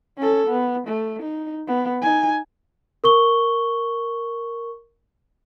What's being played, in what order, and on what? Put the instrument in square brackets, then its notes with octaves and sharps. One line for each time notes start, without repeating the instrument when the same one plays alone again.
[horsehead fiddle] C#4 A4
B3
A3
D#4
B3
D#4 G#5
[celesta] A#4 C#6 G7